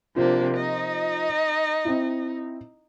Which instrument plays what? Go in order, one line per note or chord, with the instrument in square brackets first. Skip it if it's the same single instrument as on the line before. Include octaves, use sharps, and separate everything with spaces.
[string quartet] C3 A#3 D4 [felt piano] F3 F4 C5
[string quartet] D#4 D#5
[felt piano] C4 E4